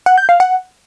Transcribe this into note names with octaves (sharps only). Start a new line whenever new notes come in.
F#5
G6
F5
F#5